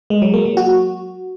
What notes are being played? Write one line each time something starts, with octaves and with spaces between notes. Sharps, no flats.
G#3
F#3
A#3
F#3
F#4